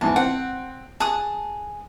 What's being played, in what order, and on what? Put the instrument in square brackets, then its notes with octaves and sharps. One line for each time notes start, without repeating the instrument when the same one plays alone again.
[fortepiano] E2 G#2 E3 [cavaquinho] A5
[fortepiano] C4 [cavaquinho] F#5
[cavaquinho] G#4 D#6 [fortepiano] A5 F#6